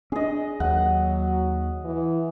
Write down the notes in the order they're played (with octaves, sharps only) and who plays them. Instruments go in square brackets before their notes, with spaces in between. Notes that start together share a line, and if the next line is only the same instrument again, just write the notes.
[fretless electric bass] C#4 D4 [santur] G#4 D#5
[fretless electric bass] D#2 [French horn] F#3 [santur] F#5
[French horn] E3